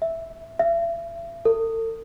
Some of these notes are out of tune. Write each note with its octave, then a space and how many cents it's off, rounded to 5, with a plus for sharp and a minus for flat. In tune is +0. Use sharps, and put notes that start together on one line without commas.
E5 -5
E5 +40
A4 +45